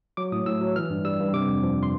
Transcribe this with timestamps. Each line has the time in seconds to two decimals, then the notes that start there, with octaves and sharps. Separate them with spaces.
0.17 F#3 D6
0.32 A2 D#6
0.46 A2 E6
0.61 F#3
0.76 E3 F6
0.90 G2
1.05 G3 E6
1.20 G2
1.33 C3 D6
1.49 F2
1.63 F3
1.83 C6